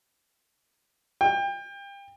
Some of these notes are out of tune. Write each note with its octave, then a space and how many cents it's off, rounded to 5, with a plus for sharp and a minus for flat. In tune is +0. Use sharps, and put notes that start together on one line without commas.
G5 +30